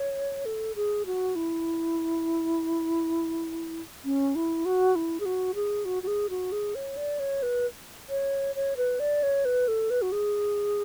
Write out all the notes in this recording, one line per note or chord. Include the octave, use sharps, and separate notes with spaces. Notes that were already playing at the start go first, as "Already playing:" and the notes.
Already playing: C#5
A4
G#4
F#4
E4
C#4
E4
F#4
E4
G#4
F#4
G#4
F#4
F#4
G#4
F#4
G#4
C#5
D5
C#5
B4
C#5
C#5
B4
D5
C#5
B4
A4
B4
F#4
G#4